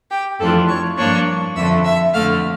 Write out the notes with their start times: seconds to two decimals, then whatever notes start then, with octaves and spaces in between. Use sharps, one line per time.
0.11 G4 G5
0.40 F2 E3 A3 D4 F4 A4 A5
0.69 C#5 C#6
0.98 G2 F3 A#3 D4 C#5 C#6
1.56 F2 D3 A3 E5 E6
1.85 E5 E6
2.13 F2 D3 A3 F5 F6